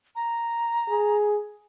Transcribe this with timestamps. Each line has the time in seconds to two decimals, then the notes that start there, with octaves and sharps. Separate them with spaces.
0.16 A#5
0.89 G#4